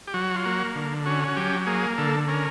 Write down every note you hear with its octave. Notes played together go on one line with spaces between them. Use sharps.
G4
F#3 F#4
F4
A#3 F#4
D3
C#4 F#4
F#4
F#3 G4
A#3 G#4
D3 A4
C#4 A#4